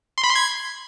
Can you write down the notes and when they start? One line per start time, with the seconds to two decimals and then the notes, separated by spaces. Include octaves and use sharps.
0.18 C6
0.24 B5
0.30 C6
0.35 G#6